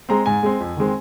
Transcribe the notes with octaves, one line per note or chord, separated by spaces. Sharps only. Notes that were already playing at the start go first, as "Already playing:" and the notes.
G#3 C4 A#5
G#2 G#5
G#3 C4
F2
D#3 G#3 C4